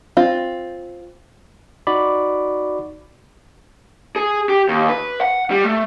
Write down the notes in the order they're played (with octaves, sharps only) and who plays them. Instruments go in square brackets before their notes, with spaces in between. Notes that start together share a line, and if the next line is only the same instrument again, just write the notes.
[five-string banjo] C4 F4
[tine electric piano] D#4 F#4 D5 B5
[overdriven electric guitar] G#4
G4
D#2
B4
F#5
G3
A3